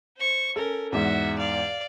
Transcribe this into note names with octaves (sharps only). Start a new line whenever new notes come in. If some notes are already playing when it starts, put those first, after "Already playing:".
C5 C#6
C#4 A4 A#4
E2 G#2 F#4 E5
D5 F5